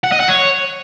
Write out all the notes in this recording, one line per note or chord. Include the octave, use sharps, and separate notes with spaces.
F#5
D#5
F#5
C#5